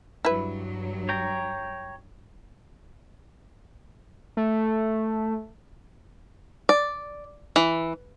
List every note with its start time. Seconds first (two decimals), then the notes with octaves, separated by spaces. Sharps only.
0.25 G2 F#3 E4 B4
1.09 C#5 G5 A#5
4.37 A3
6.69 D5
7.56 E3